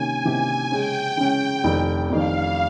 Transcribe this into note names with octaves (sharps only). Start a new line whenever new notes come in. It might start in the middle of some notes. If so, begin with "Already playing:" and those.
Already playing: C3 D#3 A#3 C#4 G4 G#5
C3 D#3 A#3 C#4 G4
C#3 G#3 C#4 G5
C#3 G#3 C#4
F1 F2 D#3
F1 F2 D#3 F5